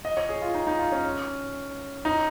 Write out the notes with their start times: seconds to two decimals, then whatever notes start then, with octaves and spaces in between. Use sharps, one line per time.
0.05 D#5
0.17 C#5
0.29 G#4
0.42 F4
0.54 D#4
0.67 D#4
0.79 F4
0.92 C#4
2.05 D#4